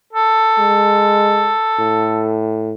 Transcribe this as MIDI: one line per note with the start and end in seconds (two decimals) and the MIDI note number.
0.13 2.40 69
0.59 1.53 56
1.79 2.75 45